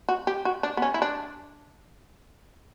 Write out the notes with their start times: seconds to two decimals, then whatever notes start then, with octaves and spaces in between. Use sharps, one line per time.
0.09 F#4
0.27 G4
0.45 F#4
0.63 D4
0.77 B3
0.82 C#4
0.94 E4
1.02 D4